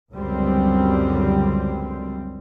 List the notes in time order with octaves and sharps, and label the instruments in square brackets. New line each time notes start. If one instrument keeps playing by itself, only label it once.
[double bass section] C#2 F#2 D3 G3 C4